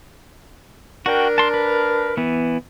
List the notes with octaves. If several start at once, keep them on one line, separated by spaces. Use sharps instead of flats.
D4 F#4 A#4 G5
A5 C6
B4
E3 B3